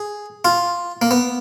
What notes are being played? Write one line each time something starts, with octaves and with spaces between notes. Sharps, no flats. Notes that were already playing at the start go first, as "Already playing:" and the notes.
Already playing: G#4
F4
A#3
B3